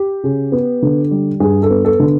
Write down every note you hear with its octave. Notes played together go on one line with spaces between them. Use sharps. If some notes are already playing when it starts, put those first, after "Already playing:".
Already playing: G4
C#3
B3
D3
G3
G2 G#4
A4
B3
A4
D3